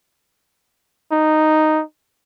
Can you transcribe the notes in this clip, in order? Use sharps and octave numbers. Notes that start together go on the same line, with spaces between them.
D#4